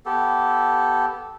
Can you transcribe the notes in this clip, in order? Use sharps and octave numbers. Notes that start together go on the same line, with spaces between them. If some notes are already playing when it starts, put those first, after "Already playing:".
B3 G4 A4